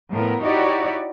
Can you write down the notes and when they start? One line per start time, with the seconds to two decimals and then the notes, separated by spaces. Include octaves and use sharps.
0.11 A2 F3 B3 A#4
0.42 D#4 E4 F#4 G4 C#5 D5